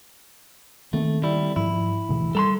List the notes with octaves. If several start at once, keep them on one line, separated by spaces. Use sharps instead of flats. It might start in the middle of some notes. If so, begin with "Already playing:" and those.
D#3 A3 A#3 C4
G3 E4
G#2 F3 E4
D2 B2 E3
G3 A4 A#5 C6